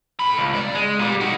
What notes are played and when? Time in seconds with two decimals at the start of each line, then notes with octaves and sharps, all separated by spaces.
0.19 A2 B5
0.37 C#2
0.54 G2 D5
0.74 G#3
0.99 A#2 G3
1.20 D#4 F#4